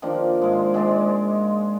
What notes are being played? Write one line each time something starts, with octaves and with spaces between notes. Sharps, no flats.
D#3 F3 A#3 D4
G#2 G#3
G#3 G#4 D5